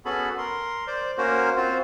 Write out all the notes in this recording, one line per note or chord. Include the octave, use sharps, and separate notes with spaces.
B3 C#4 F#4 G#4 A4 B5
A#4 C6
C5 D5
A#3 C#4 F#4 A#4 C5
C4 F4 F#4 C5